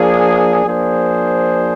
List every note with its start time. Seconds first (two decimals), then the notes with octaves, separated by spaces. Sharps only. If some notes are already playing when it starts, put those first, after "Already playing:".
Already playing: F3 A#3 D4 G#4
0.65 F3 A#3 D4 G#4 C5